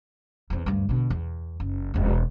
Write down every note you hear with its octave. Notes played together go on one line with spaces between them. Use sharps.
E2 C4
D2 G2
B2 D3
E2
F#1
E1 C4